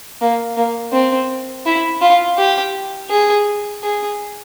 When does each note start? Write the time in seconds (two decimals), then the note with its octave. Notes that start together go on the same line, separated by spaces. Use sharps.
0.21 A#3
0.57 A#3
0.93 C4
1.66 E4
2.01 F4
2.38 G4
3.10 G#4
3.83 G#4